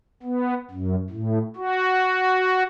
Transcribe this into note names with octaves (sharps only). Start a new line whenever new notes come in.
B3
F#2
A2
F#4